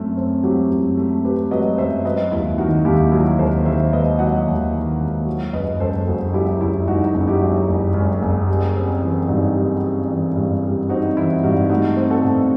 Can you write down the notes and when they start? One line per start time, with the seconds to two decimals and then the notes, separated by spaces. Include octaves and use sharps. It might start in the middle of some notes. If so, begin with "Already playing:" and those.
Already playing: F#2 A3 C4
0.17 C4
0.44 F#3 E4 G4
0.70 F#2
0.97 A3
1.25 C4 G4 B4
1.51 F#3 B4 D#5
1.78 F#2 C5 E5
2.05 F#3 B4 D#5
2.32 D#2 E4
2.58 D#3 D#4 F#4
2.85 D#2 E4 G4
3.12 F#3 E4 G4
3.38 D#2 A4 C5
3.65 D#3 C5 E5
3.92 D#2 B4 D#5
4.19 F#3 D#5 F#5
4.47 D#2
4.74 D#3
5.01 D#2
5.26 F#3
5.53 F#1 B4 D#5
5.80 F#2 A4 C5
6.07 F#1 F#4 A4
6.33 F#3 E4 G4
6.61 F#1 E4
6.87 F#2 D#4 F#4
7.14 F#1
7.28 E4 G4
7.41 F#3
7.68 F#1
7.94 F#2
8.22 F#1
8.48 G3
8.76 C4
9.02 E3
9.28 G2 D#4 F#4
9.56 G3
9.83 C4
10.10 E3
10.36 G2
10.63 G3
10.89 C4 D#4 F#4
11.16 E3 E4
11.43 G2 D#4 F#4
11.70 A3 D#4 F#4
11.97 C4
12.10 F#4 A4
12.24 B2